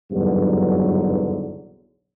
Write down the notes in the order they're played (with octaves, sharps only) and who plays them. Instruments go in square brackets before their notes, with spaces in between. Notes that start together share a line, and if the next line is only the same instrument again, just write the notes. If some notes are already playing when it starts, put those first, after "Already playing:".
[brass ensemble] F#1 B1 E2 G2 D3 F#3